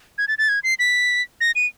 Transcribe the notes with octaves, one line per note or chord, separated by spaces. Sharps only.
G#6
A6
A6
G#6
C7
B6
A#6
D#7